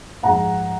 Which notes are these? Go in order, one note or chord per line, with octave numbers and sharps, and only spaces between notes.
G#2 F3 F#5 A#5